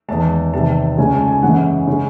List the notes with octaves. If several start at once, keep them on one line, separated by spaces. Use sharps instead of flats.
E2 D#3 G#3 A5
E2 C3 D#3 A5
C#2 C#3 G#3 G#5
A5
G#5
F#2 C#3 E3 G#3 F#5
C#3 G#3